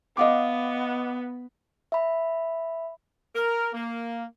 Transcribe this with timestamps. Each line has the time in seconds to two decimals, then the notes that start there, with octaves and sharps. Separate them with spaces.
0.17 B3 D#5 F5 D6
1.92 E5 B5
3.35 A#4
3.74 A#3